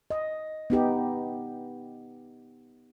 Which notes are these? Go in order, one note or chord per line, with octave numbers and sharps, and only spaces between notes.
D#5
B3 D#4 G4